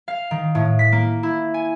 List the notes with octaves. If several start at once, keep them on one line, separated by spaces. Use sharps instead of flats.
F5
D#3
A2
B6
A#3
E4
G#5